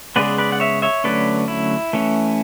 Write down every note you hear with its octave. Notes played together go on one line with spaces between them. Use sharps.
C#3 G#3 B3 B4 D5
B4 D5
F#5
C#5 E5
C#5 E5
D3 F#3 A3 C#4 B4 D5
E4
E3 A3 C#4